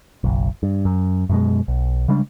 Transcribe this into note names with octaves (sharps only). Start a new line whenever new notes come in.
F#1 B1
G2
F#2
F#2 B2 G#3
B1
C#3 G3 G#3 D4